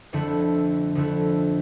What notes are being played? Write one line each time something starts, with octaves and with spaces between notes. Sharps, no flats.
F2 D3 A3 E4
F2 D3 A3 E4